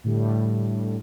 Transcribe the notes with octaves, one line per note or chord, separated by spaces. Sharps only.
A2 D3 G3